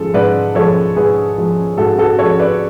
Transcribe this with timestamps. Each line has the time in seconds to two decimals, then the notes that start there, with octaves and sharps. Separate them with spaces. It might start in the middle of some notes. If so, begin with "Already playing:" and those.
Already playing: G#2 F3 G#3 A4
0.14 G#2 B4 D5
0.55 F3 G#3 A4 C#5
0.96 G#2 G#4 B4
1.38 F3 G#3
1.78 G#2 F#4 A4
1.98 F#4 A4
2.19 F3 G#3 A4 C#5
2.39 B4 D5